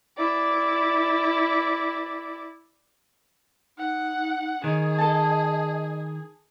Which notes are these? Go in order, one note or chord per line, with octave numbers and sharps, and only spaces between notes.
E4 D5
D#4 F#5
D#3 G#4 C#5 D#5
A4 A5